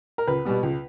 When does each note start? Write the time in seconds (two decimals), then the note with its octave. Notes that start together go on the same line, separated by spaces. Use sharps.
0.18 A#4
0.28 C#2 B4
0.45 B2 G3 B3
0.63 C#2